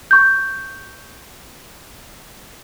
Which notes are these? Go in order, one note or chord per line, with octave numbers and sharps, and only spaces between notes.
C#6 G6